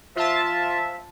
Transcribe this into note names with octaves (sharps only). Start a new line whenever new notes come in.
F3 F4 E5 A5